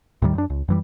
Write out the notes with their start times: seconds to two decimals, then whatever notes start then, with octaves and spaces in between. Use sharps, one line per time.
0.22 D#2 A2 D#3 G3
0.35 F#2 D4
0.50 C#2
0.68 F#2 E3 G3